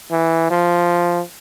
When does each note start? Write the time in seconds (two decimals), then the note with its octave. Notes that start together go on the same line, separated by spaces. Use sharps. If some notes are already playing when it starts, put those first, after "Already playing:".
0.11 E3
0.50 F3